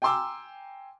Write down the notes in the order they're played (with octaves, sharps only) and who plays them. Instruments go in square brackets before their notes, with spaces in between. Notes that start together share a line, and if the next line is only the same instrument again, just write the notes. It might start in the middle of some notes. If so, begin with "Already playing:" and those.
[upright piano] G5 G#5 A#5 C6 D6 E6